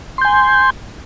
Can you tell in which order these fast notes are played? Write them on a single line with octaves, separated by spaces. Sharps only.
C6 G6 G#5